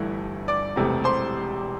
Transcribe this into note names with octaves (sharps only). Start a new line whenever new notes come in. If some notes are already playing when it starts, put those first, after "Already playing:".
Already playing: G1 G2 E3 A3 E4
D5 D6
E1 E2 C3 E3 A3
C5 C6